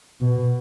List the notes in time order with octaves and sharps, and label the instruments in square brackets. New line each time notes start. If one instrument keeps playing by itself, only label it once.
[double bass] B2